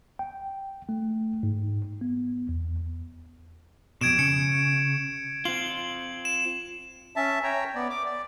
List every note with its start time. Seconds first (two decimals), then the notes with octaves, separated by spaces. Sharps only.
0.19 G5
0.89 A3
1.43 G#2
2.01 B3
2.49 E2
4.01 F2 B2 G#6 D7 E7
4.19 C#3 C#7
5.45 C4 F4 F#7
6.25 E7
7.16 C#4 E5 A5
7.43 C#5 G5 A#5
7.75 B3 D5
7.90 D6
8.05 D5